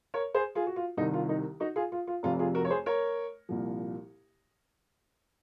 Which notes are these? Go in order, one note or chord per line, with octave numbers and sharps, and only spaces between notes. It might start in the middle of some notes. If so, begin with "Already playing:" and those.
A#4 C#5
G#4 C5
F4 G#4
F#4
F4
C2 C3 D#3 D#4
F4
D#4
D#4 F#4
F4 G#4
F4
F4
F1 F2 C3 F4
F4 G#4
F#4 A#4
C#5
G#4 C5
A#4 C#5
C2 A#2 F3